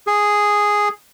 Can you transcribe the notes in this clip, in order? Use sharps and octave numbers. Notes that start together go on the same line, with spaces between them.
G#4